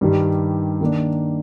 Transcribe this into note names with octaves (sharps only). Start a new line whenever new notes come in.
G2 D#3 G3
D#3 A#3 D4